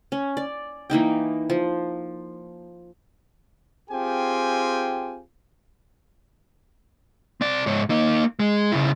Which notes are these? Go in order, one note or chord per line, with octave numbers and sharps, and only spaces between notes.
C#4
D5
E3 A#3 D#4 G5
F3
C4 F4 G4 G#4 G5 G#5
C4 D5
G#2 C#5
A#3 D#4
G#3
C#3 E4